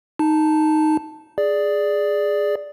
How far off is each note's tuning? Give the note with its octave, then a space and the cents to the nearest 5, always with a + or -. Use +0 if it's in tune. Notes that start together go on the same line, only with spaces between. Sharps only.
D#4 +0 A5 +0
G#4 +0 D5 +0